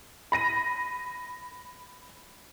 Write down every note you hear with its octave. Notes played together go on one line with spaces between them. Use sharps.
B5 A#6 D#7